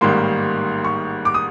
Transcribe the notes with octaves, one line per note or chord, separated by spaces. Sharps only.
A1 G#2 D#3 G3 A#3 C6
C#6
D6
D#6